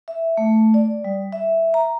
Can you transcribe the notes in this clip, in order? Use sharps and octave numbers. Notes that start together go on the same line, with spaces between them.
E5
A3
D5
G3
E5
A#5